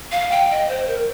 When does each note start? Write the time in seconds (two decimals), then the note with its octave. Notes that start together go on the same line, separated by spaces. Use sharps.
0.12 F5
0.31 G5
0.50 D#5
0.69 C5
0.87 A#4